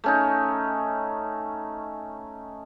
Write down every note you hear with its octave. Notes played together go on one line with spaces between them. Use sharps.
A3 C#4 D#4